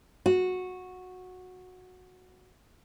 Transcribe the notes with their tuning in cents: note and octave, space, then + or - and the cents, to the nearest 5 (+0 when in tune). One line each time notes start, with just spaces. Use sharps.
F#4 -15